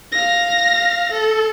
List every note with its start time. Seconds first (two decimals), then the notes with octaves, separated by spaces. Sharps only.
0.12 F5 A#6
1.12 A4